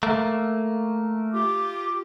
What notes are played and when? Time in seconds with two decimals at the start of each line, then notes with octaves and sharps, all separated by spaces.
0.03 A3 A#3
1.33 F4 G4 D6